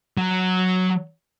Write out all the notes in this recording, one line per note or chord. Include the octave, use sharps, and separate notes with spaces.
F#3